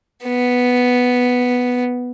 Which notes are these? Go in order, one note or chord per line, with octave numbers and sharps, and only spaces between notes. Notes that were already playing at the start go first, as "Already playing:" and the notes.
B3